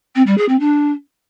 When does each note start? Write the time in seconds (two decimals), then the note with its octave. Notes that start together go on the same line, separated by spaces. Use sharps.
0.15 C4
0.26 G3
0.37 G#4
0.48 C4
0.59 D4